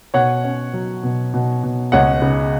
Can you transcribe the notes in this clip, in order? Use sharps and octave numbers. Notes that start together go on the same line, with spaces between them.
B2 C#5 F#5
C#4
F#3
B2
B2
B2
C#2 C#5 F#5
C#3